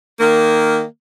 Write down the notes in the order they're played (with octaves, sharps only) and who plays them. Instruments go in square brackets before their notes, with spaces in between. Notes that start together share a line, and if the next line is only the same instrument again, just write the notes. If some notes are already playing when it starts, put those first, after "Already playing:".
[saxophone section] D#3 A#3